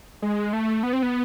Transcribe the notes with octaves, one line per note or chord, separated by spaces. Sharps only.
G#3
A3
B3
C4
B3